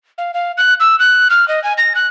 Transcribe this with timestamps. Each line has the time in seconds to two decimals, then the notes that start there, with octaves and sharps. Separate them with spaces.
0.18 F5
0.34 F5
0.57 F#6
0.80 E6
0.99 F#6
1.30 F6
1.48 D#5
1.63 G#5
1.78 A#6
1.95 F#6